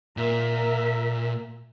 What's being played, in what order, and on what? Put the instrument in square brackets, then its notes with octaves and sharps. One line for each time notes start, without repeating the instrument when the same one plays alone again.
[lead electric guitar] A#2 [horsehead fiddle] A#4 E5